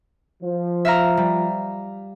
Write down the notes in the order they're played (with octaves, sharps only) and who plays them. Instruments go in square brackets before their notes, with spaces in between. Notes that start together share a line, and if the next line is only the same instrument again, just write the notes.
[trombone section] F3
[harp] E5 F5 A#5
G3